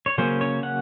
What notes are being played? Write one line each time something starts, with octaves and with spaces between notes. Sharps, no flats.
C#5
C#3 F#3 A#3 C#4 C5
C#5
F#5